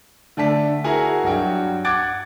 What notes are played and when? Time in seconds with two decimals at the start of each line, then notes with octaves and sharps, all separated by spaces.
0.37 D3 A3 D5 A5 B6
0.84 E4 F#4 G#4 A#4 F#5 G#5
1.23 G2 F#3 F#4 G5
1.85 F#5 D6 F#6 G#6 A6 D7